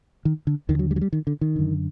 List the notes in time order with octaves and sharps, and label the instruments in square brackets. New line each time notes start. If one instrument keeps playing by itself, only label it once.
[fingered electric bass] D#3
D3
D#2 D3 D#3
F#3
G3
F#3
G3
D#3
D3
D#3
F#2 D3